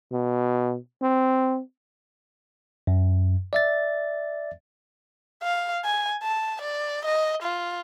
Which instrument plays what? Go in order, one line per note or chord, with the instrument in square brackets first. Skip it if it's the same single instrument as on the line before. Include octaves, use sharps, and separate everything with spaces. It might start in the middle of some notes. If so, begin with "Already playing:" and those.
[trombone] B2
C4
[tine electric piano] F#2
D5 E5 A6
[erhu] F5
G#5
A5
D5
D#5
F4